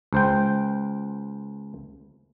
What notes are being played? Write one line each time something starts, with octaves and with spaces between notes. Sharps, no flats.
C#2 C5 G5